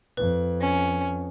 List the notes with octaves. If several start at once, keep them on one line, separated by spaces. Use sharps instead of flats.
F2 B4
C#4